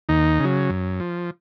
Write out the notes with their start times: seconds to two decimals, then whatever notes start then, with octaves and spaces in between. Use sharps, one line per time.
0.09 D#2 D#4
0.40 C#3 F#3
0.70 F#2
1.00 F3